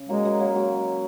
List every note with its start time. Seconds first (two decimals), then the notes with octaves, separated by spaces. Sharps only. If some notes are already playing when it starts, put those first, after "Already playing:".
Already playing: C#3
0.09 F#3 G#3 A#3
0.25 F#3 A#3
0.40 F#3 A#3
0.56 F#3